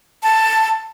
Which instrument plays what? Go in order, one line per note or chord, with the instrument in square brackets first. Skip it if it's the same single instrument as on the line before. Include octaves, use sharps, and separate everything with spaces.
[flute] A5